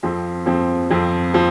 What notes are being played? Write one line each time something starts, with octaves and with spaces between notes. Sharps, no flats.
F2 F3 C4
F2 F3 C4
F2 F3 C4
F3 C4